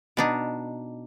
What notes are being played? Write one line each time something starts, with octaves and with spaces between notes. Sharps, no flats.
B2 D4 D#4